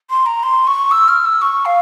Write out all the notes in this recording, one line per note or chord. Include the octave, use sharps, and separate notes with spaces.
C6
A#5
C6
C#6
E6
F6
E6
C#6
F5